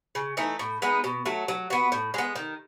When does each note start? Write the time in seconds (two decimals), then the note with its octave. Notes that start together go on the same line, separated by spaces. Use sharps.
0.15 C#3
0.37 E3 A3 D#4
0.59 A2
0.82 G#3 B3 D#4
1.04 B2
1.26 F#3 A3
1.48 F#3
1.70 B3 F#4
1.92 A2
2.14 G#3 B3
2.36 D#3